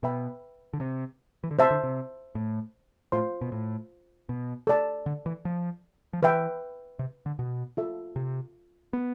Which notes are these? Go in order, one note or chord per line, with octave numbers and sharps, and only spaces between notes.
B2 B4 E5 G5 B5
D3
C3
E3
D3
C3 C5 E5 A5 C6
D3
C3
A2
A2 F4 C5 F5 C6
B2
A2
B2
A4 D5 A5
D3
E3
F3
F3
E3 B4 E5 G5
C3
D3
B2
F4 A4 E5
C3
B3